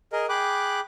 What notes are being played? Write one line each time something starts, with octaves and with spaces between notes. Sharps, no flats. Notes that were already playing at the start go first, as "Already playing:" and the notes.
G#4 A#4 D#5
G#4 G5 B5 D6 F#6